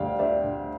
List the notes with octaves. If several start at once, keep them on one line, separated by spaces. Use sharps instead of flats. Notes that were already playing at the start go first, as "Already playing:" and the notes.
Already playing: D2 G3 D5 F5 G5
D4 C5 E5
D3